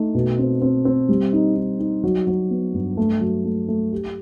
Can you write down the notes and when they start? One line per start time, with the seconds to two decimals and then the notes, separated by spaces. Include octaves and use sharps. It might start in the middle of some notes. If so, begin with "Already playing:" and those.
Already playing: A3 D#4
0.15 B2
0.38 C4
0.62 C4
0.85 C4
1.09 G3
1.33 D#4
1.56 D#4
1.80 D#4
2.04 F#3
2.27 F#3
2.50 B3
2.74 G2
2.97 A3
3.21 F#3
3.45 A3
3.68 A3
3.93 G4